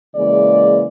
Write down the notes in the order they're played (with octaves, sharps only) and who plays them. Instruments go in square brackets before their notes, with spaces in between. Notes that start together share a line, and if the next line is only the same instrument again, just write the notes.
[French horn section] C#3 E3 G#3 A#3 D5